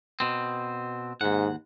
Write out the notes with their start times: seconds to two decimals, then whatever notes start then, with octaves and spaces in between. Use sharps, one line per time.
0.20 B2 C4
1.21 D#2 G#2 F#5